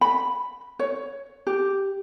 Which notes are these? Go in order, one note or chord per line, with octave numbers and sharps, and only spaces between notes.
B5
C#5
G4